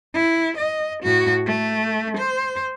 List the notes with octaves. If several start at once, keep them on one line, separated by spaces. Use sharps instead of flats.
E4
D#5
A2 F#4
A3
C5